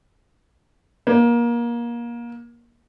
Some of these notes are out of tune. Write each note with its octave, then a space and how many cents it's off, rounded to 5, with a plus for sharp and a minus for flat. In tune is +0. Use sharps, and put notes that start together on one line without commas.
A#3 +25